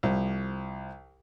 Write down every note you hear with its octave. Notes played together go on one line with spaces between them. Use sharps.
C2 F3